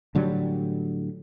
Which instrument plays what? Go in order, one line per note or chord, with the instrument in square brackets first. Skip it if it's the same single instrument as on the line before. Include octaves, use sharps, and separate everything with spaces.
[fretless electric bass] A2 D3 F#3 G3